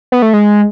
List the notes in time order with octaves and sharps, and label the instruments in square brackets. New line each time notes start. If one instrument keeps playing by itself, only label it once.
[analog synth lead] B3
A3
G#3